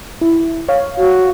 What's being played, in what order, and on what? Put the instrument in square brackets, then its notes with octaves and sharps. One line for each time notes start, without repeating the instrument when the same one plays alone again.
[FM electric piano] E4
C#5 F5
[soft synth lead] F#4